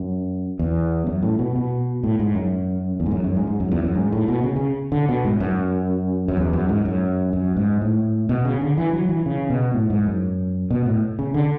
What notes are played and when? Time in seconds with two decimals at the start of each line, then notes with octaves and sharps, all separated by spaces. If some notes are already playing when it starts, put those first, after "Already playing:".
Already playing: F#2
0.59 E2
1.07 F#2
1.23 A2
1.39 B2
1.56 B2
2.04 A2
2.19 G#2
2.35 F#2
3.00 E2
3.06 G#2
3.11 F#2
3.24 F#2
3.36 G#2
3.47 G#2
3.60 F#2
3.72 E2
3.84 F#2
3.95 G#2
4.12 A2
4.28 B2
4.44 C#3
4.56 C#3
4.92 D3
5.09 B2
5.25 G#2
5.40 F#2
6.28 F#2
6.37 E2
6.53 F#2
6.69 G#2
6.85 F#2
7.33 F#2
7.57 G#2
7.82 A2
8.29 B2
8.45 C#3
8.61 D3
8.78 E3
8.93 F#3
9.09 E3
9.26 C#3
9.50 B2
9.74 A2
9.90 G#2
10.06 F#2
10.71 B2
10.86 A2
11.19 C#3
11.34 D3